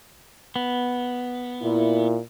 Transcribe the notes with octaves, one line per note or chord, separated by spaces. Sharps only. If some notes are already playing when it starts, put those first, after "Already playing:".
B3
A#2 E4